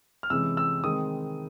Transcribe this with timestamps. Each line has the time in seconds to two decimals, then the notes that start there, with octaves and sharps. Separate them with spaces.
0.23 F6
0.30 C3 E3 G#3 C#4 E6
0.57 E6
0.84 D#3 G#3 C4 D#6